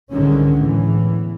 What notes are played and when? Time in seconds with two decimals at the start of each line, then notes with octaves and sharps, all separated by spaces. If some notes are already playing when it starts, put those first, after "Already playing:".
0.12 C2 G#2 D3 D#3 G#3 C#4
0.60 E2 A2 E3